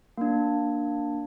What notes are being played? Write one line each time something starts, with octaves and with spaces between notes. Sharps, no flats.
A#3 D4